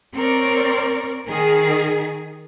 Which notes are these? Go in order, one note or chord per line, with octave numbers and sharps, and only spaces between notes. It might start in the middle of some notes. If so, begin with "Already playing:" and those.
C4 A#4 C#5 D5
D#3 G#4